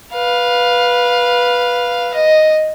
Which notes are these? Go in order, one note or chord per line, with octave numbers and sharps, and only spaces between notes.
B4 F5
D#5